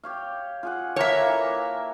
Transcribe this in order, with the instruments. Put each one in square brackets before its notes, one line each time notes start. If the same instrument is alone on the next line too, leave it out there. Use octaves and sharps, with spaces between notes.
[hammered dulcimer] G4 C#5 F5
F4 G#4 F#5
[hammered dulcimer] A#3 A4 [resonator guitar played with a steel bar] C#5 E5
[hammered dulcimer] E3